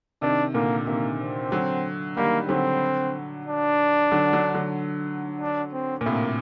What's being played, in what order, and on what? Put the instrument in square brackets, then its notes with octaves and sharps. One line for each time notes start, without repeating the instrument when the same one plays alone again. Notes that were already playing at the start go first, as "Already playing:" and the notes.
[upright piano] C3 D#3 [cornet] D4
[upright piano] A#2 D3 [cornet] A#3
[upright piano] C3 D#3 [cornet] A#3
[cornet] C4
[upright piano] D3 F#3
[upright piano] D#3 G3 [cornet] A#3
[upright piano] D3 F#3 [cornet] C4
[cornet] D4
[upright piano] D3 F#3
D3 F#3
D3 F#3
[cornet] D4
C4
[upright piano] A#2
[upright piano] A2 C3 [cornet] A#3